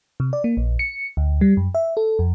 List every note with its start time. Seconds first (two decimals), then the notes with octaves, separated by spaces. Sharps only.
0.20 C3
0.33 D5
0.44 A#3
0.57 A#1
0.79 C#7
1.17 D2
1.41 G3
1.57 F#2
1.75 E5
1.97 A4
2.19 F2